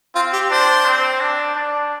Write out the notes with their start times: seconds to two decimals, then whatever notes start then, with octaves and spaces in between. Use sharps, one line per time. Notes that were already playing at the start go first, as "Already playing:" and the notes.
0.15 C4 F4
0.33 G4
0.50 D4 C5
0.86 C4
1.21 D4
1.56 D4